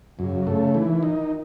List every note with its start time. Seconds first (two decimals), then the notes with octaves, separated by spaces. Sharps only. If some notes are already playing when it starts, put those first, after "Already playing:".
0.19 F#2 C#3
0.47 C#3 A3
0.74 D#3 E3
1.03 D#4